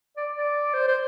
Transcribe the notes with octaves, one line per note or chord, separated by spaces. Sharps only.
D5
D5
C5
C5